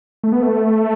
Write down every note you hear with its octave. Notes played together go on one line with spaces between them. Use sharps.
A3
B3
A3